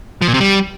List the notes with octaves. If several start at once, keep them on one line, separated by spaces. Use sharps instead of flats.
F3
A#2
C3
G3